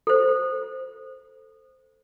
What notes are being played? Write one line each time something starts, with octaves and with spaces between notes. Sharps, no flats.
A4 C5